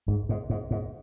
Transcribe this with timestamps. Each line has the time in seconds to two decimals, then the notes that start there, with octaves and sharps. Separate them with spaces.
0.08 G#2
0.29 G#2
0.50 G#2
0.71 G#2